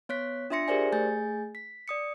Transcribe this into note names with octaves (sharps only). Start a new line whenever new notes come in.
B3 C#5 F#6 B6
D4 F4 E5 C6 A#6 C#7
G4 G#4 A#4 C5 D5 G#5
A3 G#4 G#5 G6 A6
B6
D5 D#6 C#7